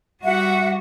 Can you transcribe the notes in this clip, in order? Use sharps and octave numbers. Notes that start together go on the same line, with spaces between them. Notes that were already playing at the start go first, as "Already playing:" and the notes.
G3 F#4 E5 F#5